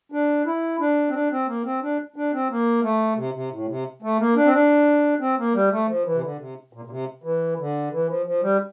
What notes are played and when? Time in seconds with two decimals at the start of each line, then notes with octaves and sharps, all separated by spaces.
0.12 D4
0.46 E4
0.80 D4
1.09 C4
1.13 D4
1.31 C4
1.47 A#3
1.65 C4
1.82 D4
2.16 D4
2.33 C4
2.50 A#3
2.83 A3
3.17 C3
3.34 C3
3.51 A2
3.69 C3
4.02 A3
4.19 A#3
4.35 D4
4.45 C4
4.53 D4
5.20 C4
5.38 A#3
5.54 G3
5.71 A3
5.88 F3
6.05 E3
6.15 C3
6.22 D3
6.39 C3
6.73 A#2
6.85 A#2
6.90 C3
7.23 E3
7.58 D3
7.92 E3
8.08 F3
8.26 F3
8.42 G3